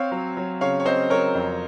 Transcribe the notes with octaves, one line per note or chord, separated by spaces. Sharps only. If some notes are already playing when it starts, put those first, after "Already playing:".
Already playing: C4 C#5 F5
F#3
F#3
C#3 C#5 F5
C#5
C4 C5 D#5
F#3 A#4 C#5
F2